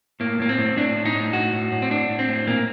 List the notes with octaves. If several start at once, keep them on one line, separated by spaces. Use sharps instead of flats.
A2 A#3
A2 A#3
C4
A2
A2 D4
A2
D#4
A2
A2 F#4
A2
A2
C4
A2 D4
A2
C4
A2
A#2 A#3